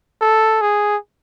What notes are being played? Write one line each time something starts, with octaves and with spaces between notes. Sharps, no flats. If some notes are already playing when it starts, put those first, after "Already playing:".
A4
G#4